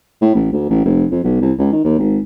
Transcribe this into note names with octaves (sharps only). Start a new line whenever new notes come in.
A2
A1
D2
A1
F1
F2
B1
C2
C#2
D#3
D#2
G#1